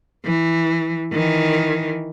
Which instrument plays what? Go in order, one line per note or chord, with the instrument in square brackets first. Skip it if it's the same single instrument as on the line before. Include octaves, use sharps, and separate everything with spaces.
[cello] E3
D#3 E3